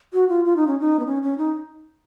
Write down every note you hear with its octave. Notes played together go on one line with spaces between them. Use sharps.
F#4
F4
F4
D#4
C#4
D#4
B3
C#4
C#4
D#4